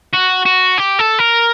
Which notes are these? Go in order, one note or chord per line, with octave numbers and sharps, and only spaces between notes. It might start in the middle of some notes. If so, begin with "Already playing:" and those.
F#4
F#4
G4
A4
A#4